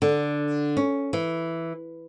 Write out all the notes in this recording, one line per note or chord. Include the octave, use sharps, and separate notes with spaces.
D3
C#4
E3